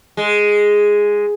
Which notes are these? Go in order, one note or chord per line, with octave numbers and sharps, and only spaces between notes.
G#3